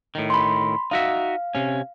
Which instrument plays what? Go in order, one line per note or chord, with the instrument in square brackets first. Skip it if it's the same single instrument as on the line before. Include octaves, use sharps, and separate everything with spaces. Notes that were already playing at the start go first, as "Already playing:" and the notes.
[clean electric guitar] A2 D#3
[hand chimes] B5 C6
[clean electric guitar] D#4 F#4 E5 [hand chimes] F5
[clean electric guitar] C3 C#4